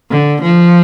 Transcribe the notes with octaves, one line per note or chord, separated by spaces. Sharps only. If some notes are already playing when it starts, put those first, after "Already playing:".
D3
F3